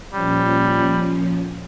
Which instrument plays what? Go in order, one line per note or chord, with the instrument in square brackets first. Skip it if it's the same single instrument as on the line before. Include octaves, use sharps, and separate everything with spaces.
[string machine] A#2 F3 C#4 [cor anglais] G3